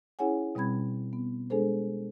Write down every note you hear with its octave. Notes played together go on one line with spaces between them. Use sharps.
C#4 E4 G#4 C#5 F#5 G#5
B2 G3 C4 B5 G#6
B3
G#3 D4 G#4 A4 C5